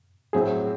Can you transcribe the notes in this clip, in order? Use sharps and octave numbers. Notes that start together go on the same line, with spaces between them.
A2 F#3 C4 E4 G#4